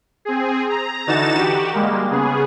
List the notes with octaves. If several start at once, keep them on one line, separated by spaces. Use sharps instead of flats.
C4 G#4
A#5
D3 E3 D#4 F#4 A6 E7
F#4 G4
G3 G#3 A#3
C#3 B3 G#4